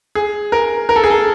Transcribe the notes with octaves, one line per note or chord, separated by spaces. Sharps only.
G#4
A#4
A#4
A4
G#4
A4